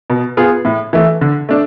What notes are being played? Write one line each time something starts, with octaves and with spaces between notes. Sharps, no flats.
B2
B3 F4 G#4
A2
E3 A3
D3
A3 D4